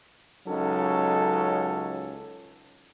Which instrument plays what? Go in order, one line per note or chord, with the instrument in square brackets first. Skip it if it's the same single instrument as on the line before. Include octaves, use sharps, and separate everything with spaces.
[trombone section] C#2 F#3 C#4 D#4 A4